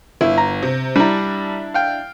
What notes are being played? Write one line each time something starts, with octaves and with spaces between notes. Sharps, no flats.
G1 E4
A#5
C3
G3 D4 E4 A#5
F5 G5